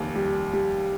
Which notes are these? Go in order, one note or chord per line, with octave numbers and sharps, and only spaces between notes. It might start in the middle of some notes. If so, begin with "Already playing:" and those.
Already playing: F1 D#2
G3
G3